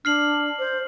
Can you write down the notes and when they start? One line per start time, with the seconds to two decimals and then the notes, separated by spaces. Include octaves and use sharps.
0.05 D4 F6 C7 F#7
0.59 C5